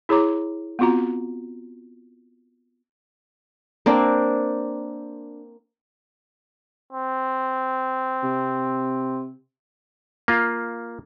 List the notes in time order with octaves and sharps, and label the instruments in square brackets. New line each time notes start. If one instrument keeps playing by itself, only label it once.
[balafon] E4 G#4 C#5 A#5 D6
B3 C4 F4 F#4 A#5
[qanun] A#3 C4 D4
[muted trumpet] C4
[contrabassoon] C3
[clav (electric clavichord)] A#3 F4